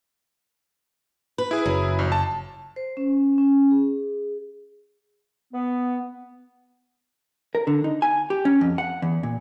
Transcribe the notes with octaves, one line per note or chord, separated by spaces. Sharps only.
B4
E4 G#4
F#1 F#3
A#1
A5
C5
C#4
C#4
G#4
B3
A#4
D3
D#4
G#5
G4
C#4
F2
F#5
E2
A#2